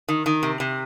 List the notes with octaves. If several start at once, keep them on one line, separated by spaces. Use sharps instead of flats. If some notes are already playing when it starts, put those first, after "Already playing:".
D#3
D#3
C3
C3